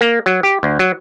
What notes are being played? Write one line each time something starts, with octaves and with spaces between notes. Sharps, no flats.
A#3
F#3
G4
D2
F#3